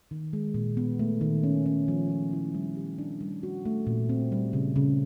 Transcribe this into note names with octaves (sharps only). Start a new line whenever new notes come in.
D#3
G#3
A#2
B3
A3
D#3
C#4
C#4
F3
F3
E4
G3
G4
D4
G3
F#4
A3
A#2
C4
G3
C#3
C#3